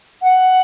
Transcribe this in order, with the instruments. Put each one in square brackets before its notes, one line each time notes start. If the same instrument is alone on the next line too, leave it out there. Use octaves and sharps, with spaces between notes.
[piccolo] F#5